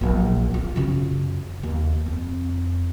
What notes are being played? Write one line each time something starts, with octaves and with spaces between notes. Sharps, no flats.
A#1 F#3
A#3 F4
F#2 C#3
D#2
F2